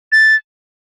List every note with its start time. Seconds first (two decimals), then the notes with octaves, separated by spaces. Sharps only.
0.12 A6